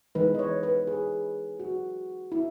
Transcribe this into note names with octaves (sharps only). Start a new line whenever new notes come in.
E3 G#3 D#4 B4
D#5
C#5
B4
G#4
F#4
E4